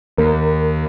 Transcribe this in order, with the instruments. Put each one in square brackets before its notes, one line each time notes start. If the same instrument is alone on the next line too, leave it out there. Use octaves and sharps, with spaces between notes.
[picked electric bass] D#2 [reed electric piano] A#4